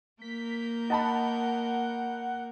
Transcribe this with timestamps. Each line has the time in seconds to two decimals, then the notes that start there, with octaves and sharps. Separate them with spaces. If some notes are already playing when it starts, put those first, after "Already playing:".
0.22 A#3 A#4 G6 B6
0.90 D#5 F#5 A5 B5